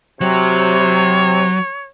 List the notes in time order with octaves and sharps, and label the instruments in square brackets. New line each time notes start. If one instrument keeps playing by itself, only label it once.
[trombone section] C3 [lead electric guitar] F#3 [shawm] C#5